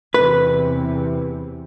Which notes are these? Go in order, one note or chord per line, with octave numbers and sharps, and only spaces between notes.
E2 C3 E3 B4